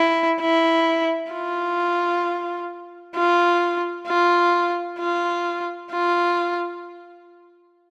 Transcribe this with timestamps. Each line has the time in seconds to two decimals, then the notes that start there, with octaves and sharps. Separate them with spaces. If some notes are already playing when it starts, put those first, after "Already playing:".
Already playing: E4
0.40 E4
1.32 F4
3.16 F4
4.07 F4
4.99 F4
5.91 F4